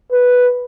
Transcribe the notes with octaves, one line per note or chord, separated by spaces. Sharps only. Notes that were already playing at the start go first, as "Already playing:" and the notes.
B4